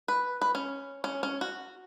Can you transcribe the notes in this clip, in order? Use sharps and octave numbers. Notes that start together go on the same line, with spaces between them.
B4
B4
C#4
C#4
C#4
F#4